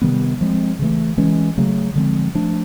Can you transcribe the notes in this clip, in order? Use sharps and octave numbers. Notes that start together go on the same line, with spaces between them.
C3 D#3 G3 B3
F3 G#3 C4
C#3 E3 A3
E3 G#3 C#4
C#3 F#3 A3
D3 F3 G#3 C4
F3 A3 D4